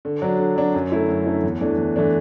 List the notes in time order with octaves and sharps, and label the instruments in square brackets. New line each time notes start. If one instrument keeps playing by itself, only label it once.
[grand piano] D3
F#3 D4
D3
F#3 D4
F#2
D3 A3 E4
F#2
D3 A3 E4
E2
E3 A3 D4
E2
E3 A3 D4